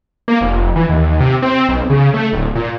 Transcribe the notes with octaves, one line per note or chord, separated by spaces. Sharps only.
A#3
F1
E3
D#2
C3
C4
B1
C#3
A3
D1
A#2